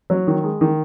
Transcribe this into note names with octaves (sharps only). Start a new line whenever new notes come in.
F#3
D#3
G#3
D#3